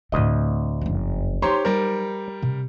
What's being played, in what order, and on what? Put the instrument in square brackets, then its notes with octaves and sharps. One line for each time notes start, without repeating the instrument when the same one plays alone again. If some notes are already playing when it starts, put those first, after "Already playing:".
[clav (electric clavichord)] D2 D#5 [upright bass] A2 C4
[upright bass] F#1 F2
[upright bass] F#3 D#4 [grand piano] G4 C#5 C6 [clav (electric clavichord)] C5 A#5
[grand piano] G3 A#4
[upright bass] C3